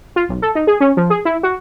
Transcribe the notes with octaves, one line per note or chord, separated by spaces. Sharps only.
F4
B1
A4
D#4
G#4
C#4
F3
G#4
E4
F#4